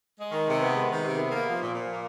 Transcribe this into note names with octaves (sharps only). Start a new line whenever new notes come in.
G#3
D#3
C3
B3
G#3
D#3
C3
B3
A#3
F3
A#2
A#2
A#3